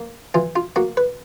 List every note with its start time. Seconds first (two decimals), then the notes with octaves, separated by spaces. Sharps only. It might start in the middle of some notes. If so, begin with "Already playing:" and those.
Already playing: A#3
0.34 E3 F4
0.56 F4
0.76 A#3 F#4
0.97 B4